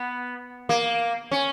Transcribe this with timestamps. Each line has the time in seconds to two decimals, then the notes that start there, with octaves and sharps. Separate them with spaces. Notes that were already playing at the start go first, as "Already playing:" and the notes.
Already playing: B3
0.69 A#3
1.31 C#4